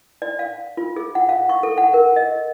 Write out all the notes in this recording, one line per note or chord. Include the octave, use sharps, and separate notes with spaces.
D5
F5
F4
G#4
F#5
F5
C#6
A4
F#5
A#4
D#5